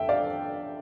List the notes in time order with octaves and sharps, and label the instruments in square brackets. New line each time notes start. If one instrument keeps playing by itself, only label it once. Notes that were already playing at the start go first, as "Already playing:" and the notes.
Already playing: [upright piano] F2 D3 E5 G5
D5 F5